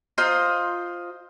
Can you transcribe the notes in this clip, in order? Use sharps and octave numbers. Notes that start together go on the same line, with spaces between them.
F4 C5 D#5 A#5